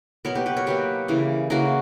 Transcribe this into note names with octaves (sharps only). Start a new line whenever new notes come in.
B2 F#3 B3 A#4 C#5
G4 B4
G4 B4
A#4 C#5
B2 F#3 A#3 G4 B4
C#3 E3 A#3
C#3 E3 A#3 F#4 A#4